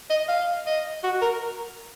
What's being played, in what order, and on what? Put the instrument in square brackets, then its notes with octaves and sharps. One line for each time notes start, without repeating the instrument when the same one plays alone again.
[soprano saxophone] D#5
F5
D#5
F#4
A#4